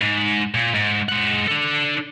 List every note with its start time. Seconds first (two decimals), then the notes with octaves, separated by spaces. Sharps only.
0.01 G#2
0.55 A#2
0.74 G#2
1.09 G#3 F#5
1.48 D4 A4